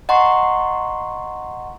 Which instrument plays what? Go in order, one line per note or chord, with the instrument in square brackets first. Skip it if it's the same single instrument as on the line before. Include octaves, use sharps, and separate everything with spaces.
[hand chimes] D#5 F#5 A#5 C6 C#6